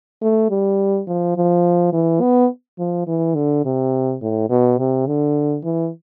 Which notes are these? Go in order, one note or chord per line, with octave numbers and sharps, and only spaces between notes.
A3
G3
F3
F3
E3
B3
F3
E3
D3
C3
A2
B2
C3
D3
E3